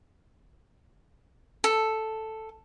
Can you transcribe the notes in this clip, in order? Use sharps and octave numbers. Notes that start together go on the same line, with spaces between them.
A4